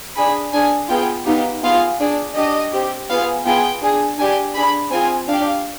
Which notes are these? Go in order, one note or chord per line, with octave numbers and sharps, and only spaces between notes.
D4 G#4 B5
D4 G#4 G#5
B3 F4 G#4 G5
B3 D#4 G4 F5
B3 F4 G#4 F5
D4 G#4 D5
D4 G4 D#5
C4 G4
B3 F4 G#4 F5
B3 F4 G#4 G5
D4 G#4
D4 G4 G#5
D4 G#4 B5
C4 F4 G#4 G#5
D4 G4 F5